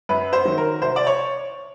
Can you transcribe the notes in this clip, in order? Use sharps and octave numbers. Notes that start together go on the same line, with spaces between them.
F#2 B4
C5
D#3 F#3
A#4
C2 C5
D5
C#5